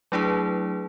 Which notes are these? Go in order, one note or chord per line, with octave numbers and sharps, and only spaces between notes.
F#3 A3 D4 E4 G#4 B4